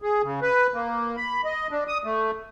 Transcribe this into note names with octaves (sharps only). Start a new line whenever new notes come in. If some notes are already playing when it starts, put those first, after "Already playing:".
G#4
C#3
B4
A#3
B5
D#5
D4
D#6
A3